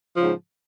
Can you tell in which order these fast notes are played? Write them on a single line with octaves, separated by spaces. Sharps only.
F3 C#3 G#2